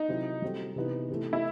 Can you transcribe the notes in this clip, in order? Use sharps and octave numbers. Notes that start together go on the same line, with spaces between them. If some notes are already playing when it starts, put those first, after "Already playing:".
Already playing: D#4
C3 F#3 C4 E4 A4
G3 C4 F#4 A4
C3 E3 B3 D#4
C3 E3 A3
E4